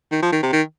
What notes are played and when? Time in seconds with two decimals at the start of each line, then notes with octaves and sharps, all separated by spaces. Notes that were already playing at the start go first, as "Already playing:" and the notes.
0.11 D#3
0.22 F3
0.32 D#3
0.42 C3
0.53 D#3